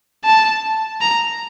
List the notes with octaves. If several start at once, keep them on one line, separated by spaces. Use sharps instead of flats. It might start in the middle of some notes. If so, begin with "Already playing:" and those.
A5
A#5